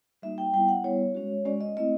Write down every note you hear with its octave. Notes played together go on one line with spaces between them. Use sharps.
G3 A#3 D#4 F#4 E5
G5
G3 B3 E4 G5
F#5
G3 B3 E4 C#5
G#3 C#4 F#4
G#3 C#4 F#4 D5
D#5
A3 C4 E4 D#5